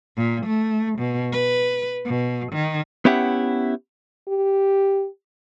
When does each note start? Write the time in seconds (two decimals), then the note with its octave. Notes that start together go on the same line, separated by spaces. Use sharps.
0.17 A#2
0.46 A3
0.99 B2
1.33 B4
2.05 B2
2.52 D#3
3.05 B3 C#4 E4 G4 E5 F#5
4.28 G4